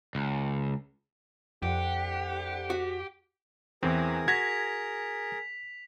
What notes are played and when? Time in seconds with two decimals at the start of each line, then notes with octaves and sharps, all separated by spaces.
0.15 C#2
1.62 C2 F2 D3 G4 F#5
2.70 F#4
3.83 E2 E3 C4 G#4 A#4
4.28 F#4 G#6 A#6 B6 F7